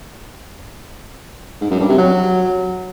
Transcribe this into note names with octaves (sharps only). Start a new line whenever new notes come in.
G#2
F#2
G2
C3
F#3